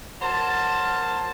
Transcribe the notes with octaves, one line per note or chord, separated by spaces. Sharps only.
F#3 A#4 C5 A5